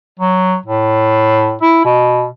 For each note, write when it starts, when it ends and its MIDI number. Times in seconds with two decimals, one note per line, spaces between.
0.20 0.56 54
0.66 1.55 45
1.62 1.80 64
1.85 2.25 47